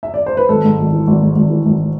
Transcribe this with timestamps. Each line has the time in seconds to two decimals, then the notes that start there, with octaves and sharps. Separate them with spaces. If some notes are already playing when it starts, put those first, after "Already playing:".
0.03 E5
0.14 D5
0.26 C5
0.37 B4
0.49 G#1 A4
0.64 G#2
0.78 G#1
0.92 E3
1.07 G#1
1.22 G#2
1.35 G#1
1.50 E3
1.65 G#1